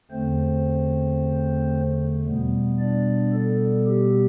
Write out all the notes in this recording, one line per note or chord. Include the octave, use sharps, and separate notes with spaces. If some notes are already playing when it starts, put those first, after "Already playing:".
E2 D3 A3 C4 C5
B2 G3 B3
D4 D5
A4
G4